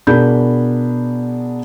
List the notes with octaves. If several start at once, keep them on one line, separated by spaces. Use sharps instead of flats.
B2 D4 G#4 A#4 B5 G6